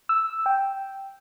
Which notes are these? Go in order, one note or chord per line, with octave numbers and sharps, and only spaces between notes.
E6
G5